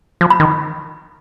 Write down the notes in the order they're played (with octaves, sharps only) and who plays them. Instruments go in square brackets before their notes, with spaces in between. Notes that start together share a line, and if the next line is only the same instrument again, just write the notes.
[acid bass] F3
[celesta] B5
[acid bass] D#3